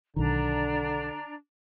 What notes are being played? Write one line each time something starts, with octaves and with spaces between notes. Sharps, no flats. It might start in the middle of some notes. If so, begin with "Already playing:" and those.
B1 D3 D#3 D4 A#5